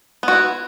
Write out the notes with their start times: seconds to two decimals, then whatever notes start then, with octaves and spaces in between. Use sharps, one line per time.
0.23 B3
0.28 F#4
0.33 E4